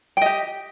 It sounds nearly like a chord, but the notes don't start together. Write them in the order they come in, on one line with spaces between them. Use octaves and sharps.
G5 D#5 G4